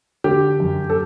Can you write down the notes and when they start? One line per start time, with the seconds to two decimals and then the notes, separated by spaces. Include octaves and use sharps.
0.24 D3 G4
0.60 F#2
0.89 A4